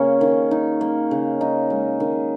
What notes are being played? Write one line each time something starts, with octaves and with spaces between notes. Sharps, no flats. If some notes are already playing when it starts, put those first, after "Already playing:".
Already playing: C#3 A#3 C#4 C#5
D#3
D#4
A#3
C#3
D#4
G#3
D#3